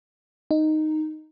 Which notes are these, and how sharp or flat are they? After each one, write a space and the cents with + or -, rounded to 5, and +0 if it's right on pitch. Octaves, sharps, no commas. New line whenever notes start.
D#4 -5